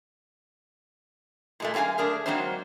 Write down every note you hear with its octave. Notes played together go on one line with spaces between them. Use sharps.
A#2 G#3 A3
F#2 A#3 F#4 F5 G#5
A3 D4 G#4 A#4
G#2 F#3 A#3 C4 D4 C5